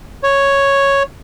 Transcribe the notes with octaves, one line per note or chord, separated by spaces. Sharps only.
C#5